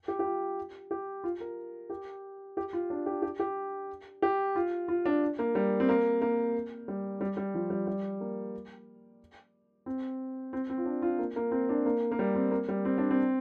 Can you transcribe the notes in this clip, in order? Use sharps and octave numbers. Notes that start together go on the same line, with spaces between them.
G4
G4
F4
G4
F4
A#4
G4
G4
F4
D4
G4
G4
G4
G4
F4
F4
D4
A#3
G3
C4
A#3
A#3
G3
G3
G3
F3
G3
G3
A#3
C4
C4
C4
F4
D4
F4
A#3
A#3
C4
D4
A#3
A#3
G3
C4
A#3
G3
C4
D4
C4